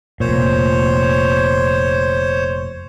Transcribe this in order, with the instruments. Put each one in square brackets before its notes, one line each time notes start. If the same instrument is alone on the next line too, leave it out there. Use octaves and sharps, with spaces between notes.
[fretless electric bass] F1 A#2 [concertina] C5 C#5